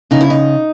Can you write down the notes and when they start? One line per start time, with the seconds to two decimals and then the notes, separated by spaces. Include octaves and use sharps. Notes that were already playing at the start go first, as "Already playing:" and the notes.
0.11 C#3 D#4
0.21 E4
0.30 D#4